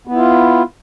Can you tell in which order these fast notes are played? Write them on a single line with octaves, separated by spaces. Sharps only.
B3 E4 F4